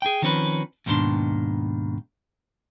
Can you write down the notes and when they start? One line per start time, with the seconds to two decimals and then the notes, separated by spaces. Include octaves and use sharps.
0.02 G#4 G5
0.22 D#3 F3 C4 C#4 A#4 B4
0.86 D#2 G#2 B2 D#3 D4 C6